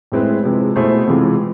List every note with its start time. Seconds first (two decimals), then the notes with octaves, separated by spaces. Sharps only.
0.12 A2 G#3 C4 E4 B4
0.44 C3 F3 G#3
0.76 B2 A3 E4 G#4 C5
1.07 C3 E3 G#3 C4 F4